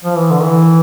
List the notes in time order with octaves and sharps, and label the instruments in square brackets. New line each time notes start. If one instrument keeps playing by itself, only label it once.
[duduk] F3
E3
D3
E3